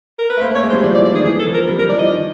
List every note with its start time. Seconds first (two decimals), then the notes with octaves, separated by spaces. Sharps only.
0.19 A#4
0.30 B4
0.37 A3
0.41 A#3 C5
0.51 A3 C#5
0.63 G#3
0.70 G3 C5
0.83 F3 D5
0.95 E3 D5
1.05 D5
1.12 D#3 G#4
1.25 E3 G#4
1.39 A4
1.47 F3
1.54 A#4
1.68 G3
1.78 G3 A#4
1.89 F3 D5
1.99 E3 D#5
2.09 D#3